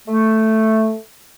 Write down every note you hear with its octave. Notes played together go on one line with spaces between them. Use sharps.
A3